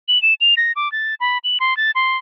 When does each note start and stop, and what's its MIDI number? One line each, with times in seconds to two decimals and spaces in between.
0.08 0.21 102
0.22 0.34 100
0.41 0.55 101
0.57 0.72 94
0.76 0.91 86
0.92 1.15 93
1.20 1.38 83
1.44 1.58 102
1.60 1.76 84
1.77 1.91 93
1.95 2.17 84